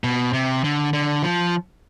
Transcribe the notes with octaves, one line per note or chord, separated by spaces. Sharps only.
B2
C3
D3
D3
F3